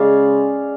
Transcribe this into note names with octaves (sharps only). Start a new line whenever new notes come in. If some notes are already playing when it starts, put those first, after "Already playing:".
Already playing: C#3 G#3 D5 F5